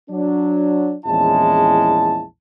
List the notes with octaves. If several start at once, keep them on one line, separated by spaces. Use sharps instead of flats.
F#3 D4
A#1 E2 G#3 C#4 E4 A5